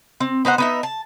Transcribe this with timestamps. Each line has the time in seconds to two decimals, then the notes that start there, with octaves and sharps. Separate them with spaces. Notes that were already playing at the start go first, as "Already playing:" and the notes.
0.20 C4
0.45 B3 D#4 C5 F#5
0.58 B3 D#4 E5
0.83 A5